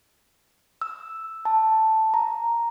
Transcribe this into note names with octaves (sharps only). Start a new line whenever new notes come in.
E6
A5
A#5